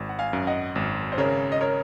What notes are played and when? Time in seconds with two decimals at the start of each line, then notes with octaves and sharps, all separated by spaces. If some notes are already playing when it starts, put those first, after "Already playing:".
Already playing: G#1
0.09 F#5
0.19 F5 G#5
0.33 F#2
0.47 D#5 F#5
0.75 G#1
1.12 C5
1.18 C#3 A#4 C#5
1.52 D#5
1.61 A#4 C#5